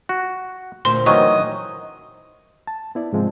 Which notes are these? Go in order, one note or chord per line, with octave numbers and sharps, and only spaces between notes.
F#4
D2 A#2 C4 C6
D#3 E3 F#3 D#5 C#6
A5
B3 E4 D5
G#2 C3 F3 G#3 C4